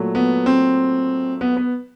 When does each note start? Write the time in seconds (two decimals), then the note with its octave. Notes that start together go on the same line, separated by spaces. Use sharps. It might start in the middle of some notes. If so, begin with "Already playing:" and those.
Already playing: A#2 F#3 A3
0.15 B3
0.46 C4
1.41 B3
1.57 B3